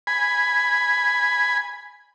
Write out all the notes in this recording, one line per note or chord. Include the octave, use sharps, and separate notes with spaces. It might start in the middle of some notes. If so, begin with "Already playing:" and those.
G#5 B5